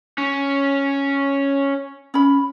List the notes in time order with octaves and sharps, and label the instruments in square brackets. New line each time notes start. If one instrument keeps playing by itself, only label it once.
[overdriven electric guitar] C#4
[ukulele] C#4 B5